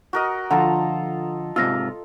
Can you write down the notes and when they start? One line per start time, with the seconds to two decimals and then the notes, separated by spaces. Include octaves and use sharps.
0.13 F#4 A#4 D#5
0.50 D3 F3 F4 A4 F#5 A#5
1.56 G#2 C3 F4 E6 F6 A#6